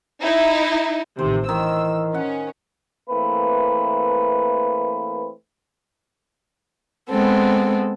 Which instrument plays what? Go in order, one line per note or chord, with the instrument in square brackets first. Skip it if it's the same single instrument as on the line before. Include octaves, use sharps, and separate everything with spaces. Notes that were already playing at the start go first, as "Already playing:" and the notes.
[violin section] D#4 E4
[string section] A1 C3 [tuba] D#3 [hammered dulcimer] C5
[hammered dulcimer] D#3 [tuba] E3 [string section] E6
[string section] C#4 [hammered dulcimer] F#5
[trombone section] E3 A3 A#3 C4 B4
[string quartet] G#3 B3 C4 A4